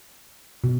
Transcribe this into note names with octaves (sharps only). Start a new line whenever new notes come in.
B2